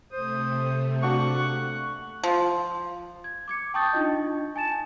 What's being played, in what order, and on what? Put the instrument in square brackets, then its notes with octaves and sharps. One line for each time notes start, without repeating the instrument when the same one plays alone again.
[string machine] C3 A3 [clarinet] C5 [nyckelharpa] D#6
[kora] A#3 D4 F#4 [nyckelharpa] F#5 [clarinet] C#6
[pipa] F3
[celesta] G#6
D6 G#6 C#7
G5 A5 C#6 D#6 G6 A6
D4 D#4 F4 D#5
G#5 A5 A6 E7